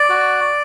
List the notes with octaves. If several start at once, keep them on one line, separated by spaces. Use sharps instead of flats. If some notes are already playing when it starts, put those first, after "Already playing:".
Already playing: D5
F#4